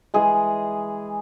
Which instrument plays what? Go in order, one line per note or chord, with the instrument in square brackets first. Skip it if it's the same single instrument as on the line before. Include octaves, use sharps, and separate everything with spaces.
[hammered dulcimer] E3 G#3 G#4